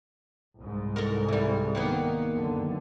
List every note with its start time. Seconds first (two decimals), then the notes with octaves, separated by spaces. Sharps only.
0.59 C2 G#2
0.96 A4 A#4
1.28 E3 G3
1.75 D#3 A#3 B3
2.33 F#2 D3